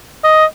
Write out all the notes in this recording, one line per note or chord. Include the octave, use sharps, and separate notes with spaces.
D#5